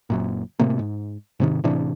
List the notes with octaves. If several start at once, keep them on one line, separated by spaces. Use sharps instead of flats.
F#1 F#2 A#2
A2 C3 A3 A#3
G#2
G#2 C3 D#3
A2 C3 E3 D4